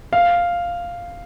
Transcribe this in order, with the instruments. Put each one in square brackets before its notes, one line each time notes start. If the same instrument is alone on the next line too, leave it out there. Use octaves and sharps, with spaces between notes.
[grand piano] F5